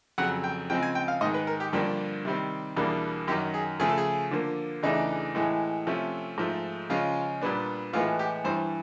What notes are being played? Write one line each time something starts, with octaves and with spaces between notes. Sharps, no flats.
F2 C#3 F#3 F#5
G5
C#3 F3 G#3 C4 G5
G#5
G5
F5
G#2 D#3 G#3 D#5
B4
A#4
G4
G2 D3 F3 A#3 D4 G4
C3 D#3 G3 C4
E2 B2 G3 A#3 D4
F#2 D#3 F#3 G4
G#4
C#3 F3 A3 G#4
A4
G#4
D3 F3 A#3
E2 C#3 E3 A3 D4 D#4
A2 E3 G#3
C3 F3 A3 C#4
G#2 F3 A3
C#3 F3 G#3 C#4 F4
A#2 G3 B3 D4
A2 E3 G#3 B3 F4
G4
G2 E3 G3 C5